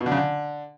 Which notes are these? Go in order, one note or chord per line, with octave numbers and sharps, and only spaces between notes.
B2
D3
C#3
D3